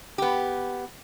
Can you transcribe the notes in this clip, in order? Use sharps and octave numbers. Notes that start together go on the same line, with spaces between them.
B3 G4